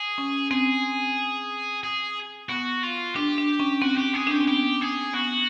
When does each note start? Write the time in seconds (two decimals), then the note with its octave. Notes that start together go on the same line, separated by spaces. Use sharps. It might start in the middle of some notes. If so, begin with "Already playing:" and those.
Already playing: G#4
0.18 C#4
0.51 C4 G#4
1.84 G#4
2.49 B3 F#4
2.83 F4
3.15 D4 G4
3.38 D4
3.60 C#4
3.82 C4 F#4
3.98 G4
4.14 G#4
4.27 D4
4.32 C#4 G4
4.41 C4
4.47 B3 G4
4.81 G#4
5.13 B3 F#4